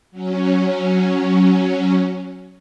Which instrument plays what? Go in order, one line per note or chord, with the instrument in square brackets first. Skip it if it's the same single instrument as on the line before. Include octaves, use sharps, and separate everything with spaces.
[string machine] F#3 C#4